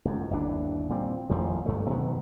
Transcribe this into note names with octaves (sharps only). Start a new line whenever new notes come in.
C#2 F#2
G1 D#2 E3 D4
A#2 G3 C4
A1 F2 D#3 F3
D2 G2 A3
B2 D#3 F#3 B3